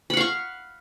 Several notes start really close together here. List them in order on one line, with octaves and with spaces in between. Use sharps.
B5 F#5 F5 C#6